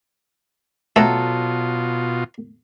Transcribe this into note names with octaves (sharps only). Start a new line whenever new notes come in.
B2 F#3 A3 F4 A4